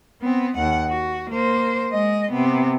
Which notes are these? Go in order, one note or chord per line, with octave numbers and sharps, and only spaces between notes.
B3 C4
D#2 F#5
F#4
A#3 C5
G#3 D#5
C3 B3